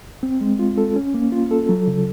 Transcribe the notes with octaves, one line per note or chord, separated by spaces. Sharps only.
C4
G#3
F4
A4
C#4
A#3
F4
A4
F#3
C#3